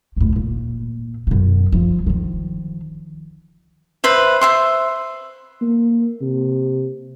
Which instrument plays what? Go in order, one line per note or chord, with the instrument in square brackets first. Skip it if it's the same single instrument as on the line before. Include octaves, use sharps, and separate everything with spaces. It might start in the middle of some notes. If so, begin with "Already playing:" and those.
[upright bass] D#2 A2
A#2
F#2 B2
F3
D#3 F3
[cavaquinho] B4 C5 E5
C5 E5 C6
[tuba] A#3
C3